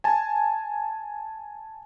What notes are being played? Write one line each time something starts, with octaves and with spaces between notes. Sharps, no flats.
G#5 A5